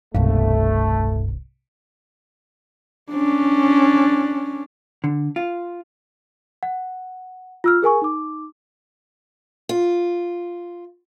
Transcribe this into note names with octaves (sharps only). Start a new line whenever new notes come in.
E1 C2 G2 A3
C#4 D4
D3
F4
F#5
F4 E6 F6
G#4 A#4 G#5 C#6
D#4 D6
F4